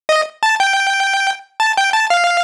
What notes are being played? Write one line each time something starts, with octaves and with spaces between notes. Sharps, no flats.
D#5
A5
G5
A5
G5
A5
F5